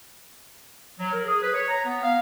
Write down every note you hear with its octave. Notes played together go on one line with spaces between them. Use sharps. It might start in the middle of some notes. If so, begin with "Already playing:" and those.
F#3
A#4
G#4
B4
C#5
A#5
B3
F5